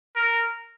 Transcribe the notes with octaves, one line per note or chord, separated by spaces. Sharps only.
A#4